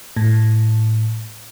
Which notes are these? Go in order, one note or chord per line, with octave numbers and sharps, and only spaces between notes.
A2